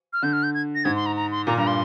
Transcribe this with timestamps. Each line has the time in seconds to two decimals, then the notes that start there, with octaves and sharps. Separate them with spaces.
0.13 F6
0.22 D3 G6
0.33 F6
0.43 G6
0.55 G#6
0.75 A#6
0.84 G#2 G#6
0.96 C6
1.06 A#5
1.16 A#5
1.31 C6
1.47 A#2 A#5
1.57 G2 A#5
1.67 C6